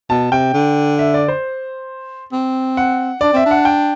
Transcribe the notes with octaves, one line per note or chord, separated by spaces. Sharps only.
B2 A5
C3 G5
D3
E5
D5
C5
C4
F#5
D4 D5
C4 E5
D4
F#5
G5